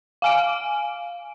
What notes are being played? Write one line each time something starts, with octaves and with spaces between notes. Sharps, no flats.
F5 G#5 D7